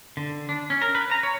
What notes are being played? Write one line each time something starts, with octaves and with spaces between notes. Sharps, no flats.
D3
D4
C#4
A#4
B4
A#5
C#5